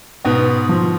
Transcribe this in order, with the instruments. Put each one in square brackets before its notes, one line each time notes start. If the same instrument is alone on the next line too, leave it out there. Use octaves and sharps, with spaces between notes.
[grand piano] G#2 B2 [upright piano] B3
[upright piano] F3